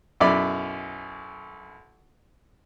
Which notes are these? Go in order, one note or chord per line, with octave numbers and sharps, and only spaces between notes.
B1 F#2 E4 D5 B5